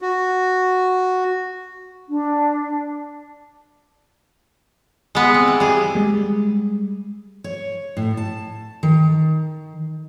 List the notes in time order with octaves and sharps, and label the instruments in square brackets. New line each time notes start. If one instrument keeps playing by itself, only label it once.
[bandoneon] F#4
[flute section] D4
[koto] G#3 B3
C4
E3
G3 G#4
[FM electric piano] G3 G#3
[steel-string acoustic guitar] C#5
A2
A5
D#3